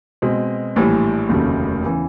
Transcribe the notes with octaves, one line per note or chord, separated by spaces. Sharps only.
B2 G#3 C4
A#1 A2 E3 G3
F1 D#2 C#3 F#3 A3
E2 C#3 E3